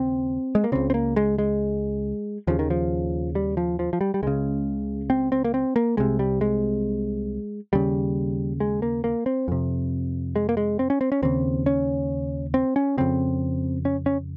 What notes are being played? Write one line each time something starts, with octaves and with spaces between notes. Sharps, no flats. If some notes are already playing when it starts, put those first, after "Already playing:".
Already playing: D#2 C#3 C4
G#3
A#3
C#2 C#3 C4
C4
A#3
G#3
G#3
D#2 C#3 F3
D#3
F3
G3
F3
F3
F3
G3
G3
C#2 C#3 G#3
C4
C4
A#3
C4
A#3
C2 C3 G#3
G3
G#3
D#2 C#3 G3
G#3
A#3
A#3
C4
F2 C3
G#3
A#3
G#3
C4
C#4
C4
C#4
D#2 C#3 C4
C#4
C4
C#4
F2 C#3 C4
C#4
C#4